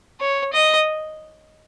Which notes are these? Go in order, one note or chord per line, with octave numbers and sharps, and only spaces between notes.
C#5
D#5